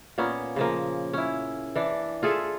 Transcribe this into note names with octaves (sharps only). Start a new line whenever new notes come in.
A#2 A#3 B3 C#4
C#3 F3 A#3
C#4 E4
E3 D4
F4 G#4 A4 E5